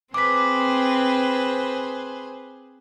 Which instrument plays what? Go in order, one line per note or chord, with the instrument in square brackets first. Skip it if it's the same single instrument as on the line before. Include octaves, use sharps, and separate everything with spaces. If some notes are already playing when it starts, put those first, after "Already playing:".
[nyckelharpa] C4 [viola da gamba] G#4 B4 C5 [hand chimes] D6 B6